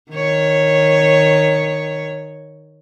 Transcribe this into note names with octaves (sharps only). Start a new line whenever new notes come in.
D#3 C#5